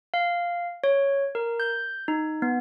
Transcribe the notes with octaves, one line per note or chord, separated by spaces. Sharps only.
F5
C#5
A#4
G6
D#4
B3